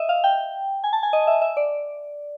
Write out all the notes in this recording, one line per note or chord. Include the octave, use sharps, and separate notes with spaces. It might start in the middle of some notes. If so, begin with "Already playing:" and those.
Already playing: D#5 E5
F5
G5
G#5
A5
G#5
D#5
E5
E5
D5